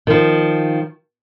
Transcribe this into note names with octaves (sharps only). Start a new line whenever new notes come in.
D#3 F3